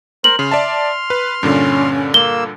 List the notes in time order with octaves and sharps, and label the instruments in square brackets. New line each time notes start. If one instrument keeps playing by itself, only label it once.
[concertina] A#4 C5 [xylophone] F#7
[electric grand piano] C#3 [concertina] C6 F6
[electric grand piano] D5 E5 A5
B4
[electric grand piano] G2 A#2 D3 [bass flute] C#4
[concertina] A#3 E6 [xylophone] G7